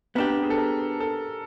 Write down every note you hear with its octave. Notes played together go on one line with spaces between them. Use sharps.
B3 D4 G4 A#4
G#4
A4
A#4
A4